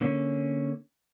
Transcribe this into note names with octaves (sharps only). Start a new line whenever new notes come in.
D3 A#3 C#4